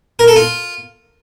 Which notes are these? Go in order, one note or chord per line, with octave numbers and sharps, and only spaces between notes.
A#4
A4
F4